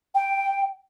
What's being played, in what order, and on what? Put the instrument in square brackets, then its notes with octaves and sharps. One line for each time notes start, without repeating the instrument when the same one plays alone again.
[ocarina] G5